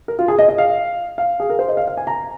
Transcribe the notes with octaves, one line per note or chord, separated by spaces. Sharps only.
A#4
F4
G#4
D#5
D#5
F5
F5
G#4
A#4
C5
D#5
F5
F5
G#5
A#5